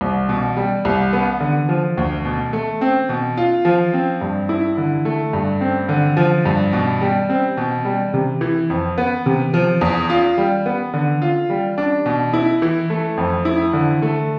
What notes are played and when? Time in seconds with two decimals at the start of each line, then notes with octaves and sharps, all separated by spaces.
0.01 C2
0.29 B2
0.57 G3
0.85 C2
1.13 B3
1.40 D3
1.69 F3
1.97 D2
2.25 B2
2.53 A3
2.81 C4
3.09 B2
3.37 F4
3.65 F3
3.93 C4
4.21 G2
4.49 E4
4.77 D3
5.05 A3
5.33 G2
5.61 C4
5.89 D3
6.17 F3
6.46 G2
6.73 B2
7.01 G3
7.30 C4
7.57 B2
7.85 G3
8.14 C3
8.41 E3
8.70 F2
8.98 B3
9.26 C3
9.54 F3
9.81 E2
10.10 F4
10.38 G3
10.66 B3
10.94 D3
11.22 F4
11.50 G3
11.78 D4
12.06 B2
12.33 E4
12.62 E3
12.90 A3
13.17 F2
13.45 E4
13.73 D3
14.02 A3